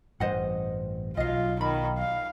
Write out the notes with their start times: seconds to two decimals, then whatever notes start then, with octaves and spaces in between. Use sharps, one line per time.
0.20 A1 G2 C5 D#5 F#5
1.17 B1 F#3 F4 D#5 F5
1.61 D#3 B5
1.98 F5